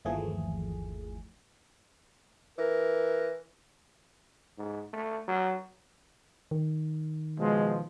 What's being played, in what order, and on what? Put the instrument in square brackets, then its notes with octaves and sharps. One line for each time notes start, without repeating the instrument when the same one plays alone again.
[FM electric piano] G1 D#2 E3 F3 A3 G#4
[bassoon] E3 [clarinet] A#4
[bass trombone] G#2
A3
F#3
[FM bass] D#3
[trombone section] B2 F3 G#3